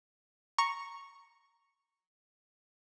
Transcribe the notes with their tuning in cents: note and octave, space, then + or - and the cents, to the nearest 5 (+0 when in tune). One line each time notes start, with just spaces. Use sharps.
A#5 +0 C#6 +0